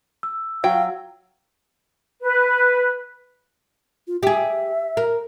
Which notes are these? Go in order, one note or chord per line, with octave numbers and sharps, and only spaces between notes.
E6
F#3 F5 G5
B4
F4
G4 G#4 E5
A#4